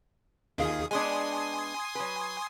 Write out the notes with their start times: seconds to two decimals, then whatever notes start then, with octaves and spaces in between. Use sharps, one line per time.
0.58 D#2 D#3 F4 G#4 F5 D#6
0.91 G#3 B3 D4 G#5 C6 D#6
1.95 F#3 B4